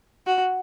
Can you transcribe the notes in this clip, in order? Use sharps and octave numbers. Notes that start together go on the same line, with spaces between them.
F#4